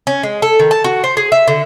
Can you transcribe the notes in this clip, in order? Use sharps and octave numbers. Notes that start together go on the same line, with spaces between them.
C#4
G#3
A4
D#3
A5
F#4
C5
G#4
E5
D3